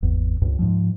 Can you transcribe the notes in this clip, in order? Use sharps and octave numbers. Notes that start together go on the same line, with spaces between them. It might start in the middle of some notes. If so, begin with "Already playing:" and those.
G#1 E2
C#2 G2
G#2 F3